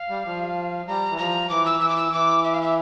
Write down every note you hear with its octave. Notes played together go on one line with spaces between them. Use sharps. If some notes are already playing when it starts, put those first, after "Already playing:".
Already playing: F5
G3
F3
G3 A#5
E3
F3 A#5
E3 D6
E6
E3 E6
D6
E6
E3 D6
E5
F5
E5